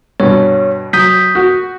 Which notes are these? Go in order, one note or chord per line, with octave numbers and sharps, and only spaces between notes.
G2 B2 C#5
F#3 D#6 G6 B6
F#4